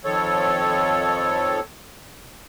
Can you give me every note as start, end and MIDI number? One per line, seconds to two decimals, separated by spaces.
0.04 1.60 41
0.04 1.60 51
0.04 1.60 53
0.04 1.60 69
0.04 1.60 73